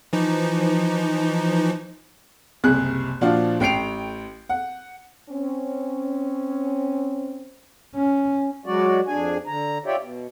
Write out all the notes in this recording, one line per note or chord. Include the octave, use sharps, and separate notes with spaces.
E3 F3 D#4
F#1 C2 C3 G#4 F#6
A#2 F3 D4 F4 F#4
A1 G5 C7 D7 F7
F#5
C4 C#4
C#4
F#3 G#3 F#4 D5
F2 D4 G#4 G#5
D3 A#5
F4 G4 C#5 D5 E5 G5
B2